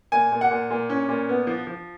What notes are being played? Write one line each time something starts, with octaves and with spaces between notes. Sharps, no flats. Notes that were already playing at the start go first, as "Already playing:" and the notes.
A#2 G#5
A#2
F#5
A#2
A#2
C#4
A#2
B3
F3
F3